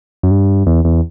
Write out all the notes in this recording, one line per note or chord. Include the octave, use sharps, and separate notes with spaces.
F#2
G2
E2
E2